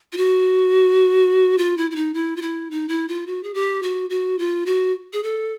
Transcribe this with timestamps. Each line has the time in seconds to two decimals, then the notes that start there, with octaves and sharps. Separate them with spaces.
0.13 F4
0.17 F#4
1.58 F4
1.77 E4
1.91 E4
1.96 D#4
2.14 E4
2.36 F4
2.42 E4
2.71 D#4
2.89 E4
3.08 F4
3.27 F#4
3.43 G#4
3.54 G4
3.83 F#4
4.10 F#4
4.39 F4
4.66 F#4
5.13 G#4
5.23 A4